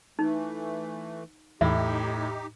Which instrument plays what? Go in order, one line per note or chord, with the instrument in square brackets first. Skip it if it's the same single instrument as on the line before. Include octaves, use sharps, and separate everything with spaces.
[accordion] E3 A3 [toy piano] D#4
[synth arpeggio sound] E2 E3 [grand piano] A2 [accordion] D#4 G4 [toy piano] E5